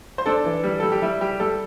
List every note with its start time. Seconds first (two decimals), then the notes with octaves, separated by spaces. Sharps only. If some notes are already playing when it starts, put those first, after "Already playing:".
0.18 C5
0.26 D4 A4
0.45 E3
0.64 G3
0.80 G3 A4
0.92 G4
1.02 G3 E4
1.21 G3 G4
1.40 G3 A4